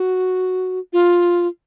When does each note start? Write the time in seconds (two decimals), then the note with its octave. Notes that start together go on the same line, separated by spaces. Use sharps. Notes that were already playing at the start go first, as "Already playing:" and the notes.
Already playing: F#4
0.93 F4